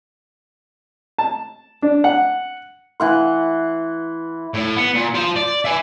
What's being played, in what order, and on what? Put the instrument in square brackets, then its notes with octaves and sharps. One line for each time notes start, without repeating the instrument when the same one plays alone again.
[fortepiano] A5
D4
F#5
[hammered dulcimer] E3 F#5 C6
[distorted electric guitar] A2
B3
A#2
F4 C5
D5
E5 G#5